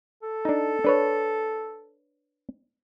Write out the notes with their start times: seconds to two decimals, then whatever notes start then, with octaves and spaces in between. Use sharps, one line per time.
0.23 A4
0.45 D4 D#4
0.84 D4 B4 C#5